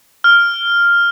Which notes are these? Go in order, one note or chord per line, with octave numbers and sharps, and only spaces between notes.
F6